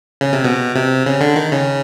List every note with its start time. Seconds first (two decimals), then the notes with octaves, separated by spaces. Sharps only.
0.21 C#3
0.33 C3
0.44 B2
0.75 C3
1.06 C#3
1.21 D3
1.36 D#3
1.52 C#3